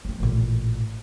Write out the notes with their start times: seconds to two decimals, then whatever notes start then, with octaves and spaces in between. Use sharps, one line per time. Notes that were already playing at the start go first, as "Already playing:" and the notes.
0.05 C4 D#4
0.20 A1 A#2